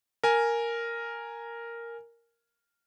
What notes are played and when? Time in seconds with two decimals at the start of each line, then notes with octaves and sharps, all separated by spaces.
0.24 A#4 G#5